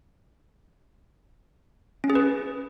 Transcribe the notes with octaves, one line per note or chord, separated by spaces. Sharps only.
C#4
G#4
B4